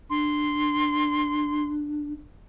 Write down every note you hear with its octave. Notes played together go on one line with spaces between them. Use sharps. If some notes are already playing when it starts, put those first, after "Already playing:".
D4 C6